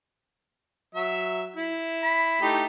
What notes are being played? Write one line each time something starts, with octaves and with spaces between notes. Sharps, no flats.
F#3 E5
E4
B5
A3 D#4 G4